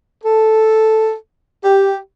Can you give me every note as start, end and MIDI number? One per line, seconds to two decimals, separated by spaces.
0.24 1.13 69
1.64 1.98 67